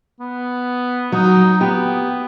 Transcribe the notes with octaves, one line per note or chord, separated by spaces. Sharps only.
B3
F#3 D#4
B3 G4